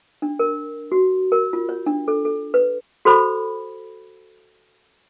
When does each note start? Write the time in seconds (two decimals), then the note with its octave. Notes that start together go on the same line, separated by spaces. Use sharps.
0.22 D4
0.39 A#4
0.92 F#4
1.32 A#4
1.53 F4
1.69 C#5
1.86 D4
2.08 A4
2.25 A4
2.54 B4
3.05 F#4 A4 C5 B5